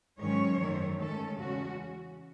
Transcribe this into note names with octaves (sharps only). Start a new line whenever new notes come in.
G#2 D#3 F#3 C#4 C#5
F#2 D#3 F#3 A3
G#2 D#3 A3 C#4 A4
E2 C#3 G#3 C#4 F#4